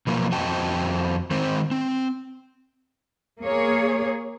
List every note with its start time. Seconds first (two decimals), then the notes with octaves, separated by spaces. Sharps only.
0.07 B2 F3 F#3 A#3
0.32 F2 C4 F#4 D#5 G5 A5
1.31 D#3 G#3 C4 C5
1.71 C4
3.42 A#3 G#4 C#5